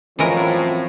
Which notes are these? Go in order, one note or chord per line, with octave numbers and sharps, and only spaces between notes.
F#2 A2 E3 F3 G#3 C4 A#4